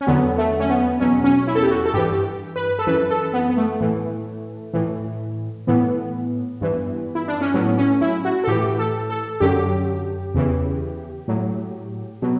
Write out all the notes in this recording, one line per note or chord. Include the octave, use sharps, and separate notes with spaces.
C#4
E2 D3 F#3 B3
A3
C#4
B3
E2 B2 F#3 C#4
C#4
E4
A4
G4
F#4
A4
G2 E3 G4
B4
A4
F#2 E3 B4
A4
B3
B3
A3
A2 E3
A2 E3
A2 E3 B3
G2 E3
E4
D4
C#4
A2 F#3 B3
C#4
E4
F#4
A4
A2 E3 G4
A4
A4
F#2 D3 F#3 G4
E2 C#3 E3
A2 F#3
B2 F#3